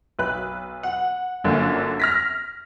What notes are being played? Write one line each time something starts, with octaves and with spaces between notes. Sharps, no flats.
B1 B4 F#6
F#5
G1 F#2 D3 A#3
F6 A#6 B6